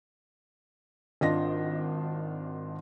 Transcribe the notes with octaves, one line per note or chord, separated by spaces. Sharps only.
G#1 D4 F4 D#5 A#6